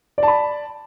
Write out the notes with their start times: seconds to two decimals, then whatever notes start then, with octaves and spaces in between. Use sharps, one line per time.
0.18 D5
0.23 A5
0.28 B5